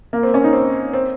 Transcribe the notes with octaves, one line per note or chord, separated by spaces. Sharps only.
A#3
C4
C#4
D#4
C4
C4